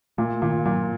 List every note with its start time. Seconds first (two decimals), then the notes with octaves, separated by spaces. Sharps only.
0.18 A#2 A3
0.42 A#2 D#3
0.65 A#2 F#3